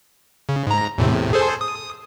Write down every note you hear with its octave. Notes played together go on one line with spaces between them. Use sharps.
C#3
G#2 A#5
E2 A2 C3
G#4 A4 C5
D#6